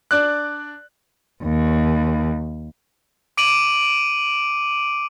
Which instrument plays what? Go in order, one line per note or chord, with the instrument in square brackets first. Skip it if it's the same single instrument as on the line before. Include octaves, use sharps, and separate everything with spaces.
[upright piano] D4 D5 F#6
[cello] D#2
[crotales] D6 D7 D#7 F#7